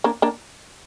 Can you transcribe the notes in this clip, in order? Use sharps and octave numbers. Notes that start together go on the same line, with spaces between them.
A#3 D4
A#3 D4